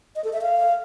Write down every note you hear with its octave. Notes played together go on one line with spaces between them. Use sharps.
D#5
A4
E5
F5